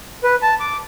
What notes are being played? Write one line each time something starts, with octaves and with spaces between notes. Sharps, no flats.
B4
A5
D6